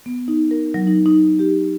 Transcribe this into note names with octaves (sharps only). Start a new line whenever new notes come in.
B3
D#4
A#4
F#3
D#4
D#4
G4